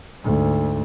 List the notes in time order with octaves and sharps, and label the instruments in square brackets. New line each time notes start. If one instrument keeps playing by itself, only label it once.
[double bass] D2 G#2